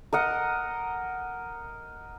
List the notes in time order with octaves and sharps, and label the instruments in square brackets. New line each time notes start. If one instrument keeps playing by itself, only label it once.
[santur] A#4 D#5 F#5